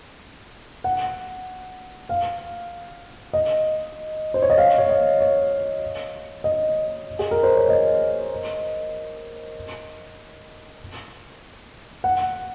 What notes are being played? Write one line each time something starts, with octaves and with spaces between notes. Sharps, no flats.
F#5
F5
D#5
C5
C#5
D#5
F5
C#5
D#5
C#5
D#5
G#4
A#4
C5
C#5
D#5
F#5